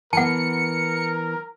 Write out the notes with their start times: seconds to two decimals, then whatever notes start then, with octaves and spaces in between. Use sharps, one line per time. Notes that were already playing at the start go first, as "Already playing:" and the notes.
0.13 E3 B3 A#4 F#5 A5 C#7